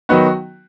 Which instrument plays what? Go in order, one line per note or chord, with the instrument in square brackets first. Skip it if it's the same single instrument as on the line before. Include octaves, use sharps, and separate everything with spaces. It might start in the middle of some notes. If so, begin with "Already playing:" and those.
[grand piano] D#3 F#3 B3 D#4 F#4